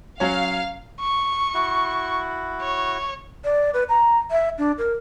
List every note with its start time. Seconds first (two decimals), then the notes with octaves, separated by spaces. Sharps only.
0.20 F#3 C#4 C#5 F5
1.00 C#6
1.54 E4 F#4
2.61 C#5
3.44 D5
3.74 B4
3.89 A#5
4.31 E5
4.58 D4
4.78 A#4